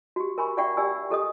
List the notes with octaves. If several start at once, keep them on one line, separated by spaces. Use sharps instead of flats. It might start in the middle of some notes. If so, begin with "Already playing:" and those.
F#4 G4
A#4 G#5 B5 C#6
D5 E5 F#5 G5 C#6
G4 D5 G#5 E6
G4 A4 D#5 D#6